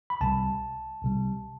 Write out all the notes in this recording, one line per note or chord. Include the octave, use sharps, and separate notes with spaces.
B5
C2 C3 G3 A5
C2 C3 G3